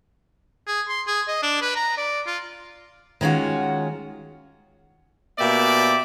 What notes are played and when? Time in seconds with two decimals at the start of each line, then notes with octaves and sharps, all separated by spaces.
0.67 G#4
0.89 C6
1.07 G#4
1.28 D#5
1.43 D4
1.62 B4
1.76 A#5
1.97 D5
2.26 F4
3.21 D#3 G#3 C#4 F4 F#4
5.39 B2 A#3 G4 D5 E5